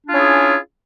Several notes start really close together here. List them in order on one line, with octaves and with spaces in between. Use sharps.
D4 F4 C#4 E4 G#4